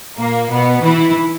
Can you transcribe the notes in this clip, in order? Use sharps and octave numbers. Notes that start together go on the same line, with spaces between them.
A#2 A#3
B2 B3
E3 E4